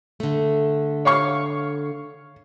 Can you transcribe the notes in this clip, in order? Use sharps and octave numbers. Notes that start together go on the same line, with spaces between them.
D3 A3
C#5 F5 C#6